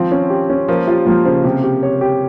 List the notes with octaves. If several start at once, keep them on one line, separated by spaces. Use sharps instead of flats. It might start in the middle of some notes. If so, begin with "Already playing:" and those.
Already playing: D#3 F3 C4
C#4
G4
C#4
F3 A#3
G3 F4
F3 A#3
C#3 C5
C3 G4
G4
C#5
G4